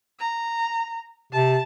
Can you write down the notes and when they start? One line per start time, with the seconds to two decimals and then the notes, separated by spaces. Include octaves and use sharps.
0.19 A#5
1.32 C3 A5